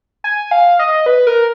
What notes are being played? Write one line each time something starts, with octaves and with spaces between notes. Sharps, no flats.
G#5
F5
D#5
B4
A#4